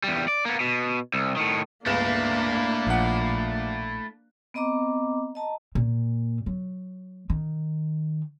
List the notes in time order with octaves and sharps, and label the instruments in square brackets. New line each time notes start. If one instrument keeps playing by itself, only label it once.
[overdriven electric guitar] E2 G3
D5
A#3 B3
B2
C2
A2 D#3
[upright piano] G1 C#2 E7 [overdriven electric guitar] A3 E4 [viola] A#3 D4
[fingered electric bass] A#1 [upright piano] F3 F#5
[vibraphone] B3 C4 D#5 A#5 D6
D#5 A5 A#5
[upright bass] A#2
F#3
D#3